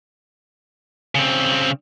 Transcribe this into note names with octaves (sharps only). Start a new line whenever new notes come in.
C#3 C4